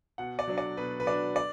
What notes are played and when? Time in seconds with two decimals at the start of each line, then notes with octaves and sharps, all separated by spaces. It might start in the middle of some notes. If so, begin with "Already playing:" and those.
0.18 B2 F#5
0.39 D5
0.48 F#3 D4
0.58 D5
0.77 B2 B4
1.00 B4
1.07 F#3 D4 D5
1.36 D5